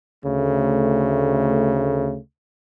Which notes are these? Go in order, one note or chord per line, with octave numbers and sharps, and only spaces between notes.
D2 C#3 A3